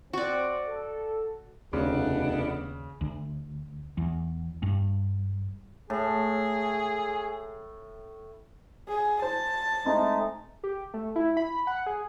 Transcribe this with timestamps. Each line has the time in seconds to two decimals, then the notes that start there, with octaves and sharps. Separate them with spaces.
0.13 C4 F#4 D5
0.67 A4
1.73 F1 D#2 C#3 B3 D4
3.01 D2
3.97 E2
4.63 G2
5.90 A2 G#4
8.88 G#4
9.22 C5 A5
9.86 G#3 A3 C4 D#4
10.63 G4
10.94 A3
11.16 E4
11.37 B5
11.67 F#5
11.86 G#4